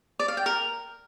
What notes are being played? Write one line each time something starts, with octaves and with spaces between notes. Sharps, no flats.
D5
F5
G5
A#4